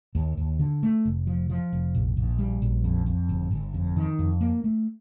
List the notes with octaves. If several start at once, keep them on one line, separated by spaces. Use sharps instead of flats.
D#2
D#2
D3
A3
F1
F3
F3
F1
A#1
A#1
G3
A#1
F2
F2
G1
G1
F2
D#3
F2
A#3
A3